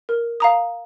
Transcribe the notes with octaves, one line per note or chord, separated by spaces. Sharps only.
A#4
F5 A#5 D#6